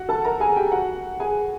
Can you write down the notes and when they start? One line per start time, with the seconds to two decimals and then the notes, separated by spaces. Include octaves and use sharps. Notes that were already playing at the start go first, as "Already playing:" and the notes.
Already playing: F#4 F#5
0.09 A4 A5
0.24 A#4 A#5
0.40 G#4 G#5
0.56 G4 G5
0.72 F#4 F#5
1.20 G#4 G#5